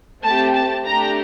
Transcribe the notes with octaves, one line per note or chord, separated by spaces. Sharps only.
A3 C4 G4 A5
A5
A3 D4 G4 A#5